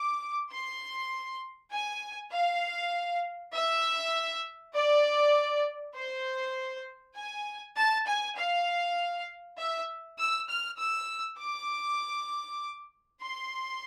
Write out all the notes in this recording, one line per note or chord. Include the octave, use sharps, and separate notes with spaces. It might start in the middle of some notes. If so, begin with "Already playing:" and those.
Already playing: D6
C6
G#5
F5
E5
D5
C5
G#5
A5
G#5
F5
E5
E6
F6
E6
D6
C6